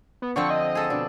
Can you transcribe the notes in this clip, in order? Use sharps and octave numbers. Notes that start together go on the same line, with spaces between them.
B3
D3 F3 C4 C#6
D#5
G#4 A4
B2 D4